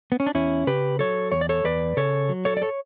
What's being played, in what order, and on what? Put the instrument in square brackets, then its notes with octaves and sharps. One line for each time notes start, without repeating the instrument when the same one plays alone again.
[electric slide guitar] B3
C#4
D4
E2 C#4 E4
C#3 G4 B4
F#3 A4 C#5
E2 C#5
D5
A4 C#5
E2 B4 D5
C#3 A4 C#5
F#3
A4 C#5
D5
A4 C#5